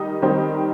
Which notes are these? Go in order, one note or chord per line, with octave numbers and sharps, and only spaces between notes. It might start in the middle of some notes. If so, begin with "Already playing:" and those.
Already playing: D#3 G3 D#4 D#6
D#3 G3 C4 D#4